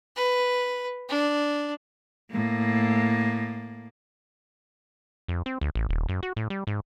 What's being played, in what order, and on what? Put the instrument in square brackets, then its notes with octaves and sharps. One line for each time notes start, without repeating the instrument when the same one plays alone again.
[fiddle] B4
D4
[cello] A2 A#3
[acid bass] F2
C4
D2
A1
D#1
F#2
F#4
A2
G3
G#2